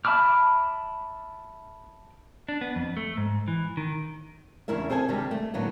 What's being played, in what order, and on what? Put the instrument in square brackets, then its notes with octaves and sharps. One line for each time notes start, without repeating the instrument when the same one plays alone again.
[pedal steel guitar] E5 A5 B5 D6 F6
[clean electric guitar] D4
B3
F2
A3
G#2
E3
D#3
[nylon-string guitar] E2 C#3 D4 E4 A#4 E5
C4 G#4 A4 G5 G#5
C3 D#3 G3 G#3 D4 G4
A3
A2 D3 F#3 A#3 B3